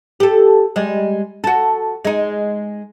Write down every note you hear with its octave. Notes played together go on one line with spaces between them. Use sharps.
G4 A4
G3 G#3
F#4 A4
G#3 D#4